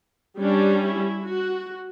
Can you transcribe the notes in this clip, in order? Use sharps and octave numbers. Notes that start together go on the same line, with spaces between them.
G3 C#4 D4
E4
F#4